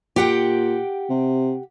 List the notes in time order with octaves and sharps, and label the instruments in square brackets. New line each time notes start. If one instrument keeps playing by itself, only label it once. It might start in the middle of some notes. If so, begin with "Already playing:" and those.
[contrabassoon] A#2 [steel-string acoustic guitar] G4 F#5 G5
[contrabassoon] C3